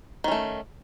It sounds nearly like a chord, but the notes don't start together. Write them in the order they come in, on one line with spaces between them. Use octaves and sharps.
D#3 C#4 A3